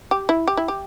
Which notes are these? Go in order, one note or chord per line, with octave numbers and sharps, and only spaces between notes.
G4
E4
G4
E4
G4